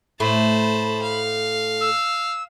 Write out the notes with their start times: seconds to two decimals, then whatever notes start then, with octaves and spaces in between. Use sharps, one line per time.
0.20 A2 A3 C5 A5 B5
1.02 F5
1.80 E6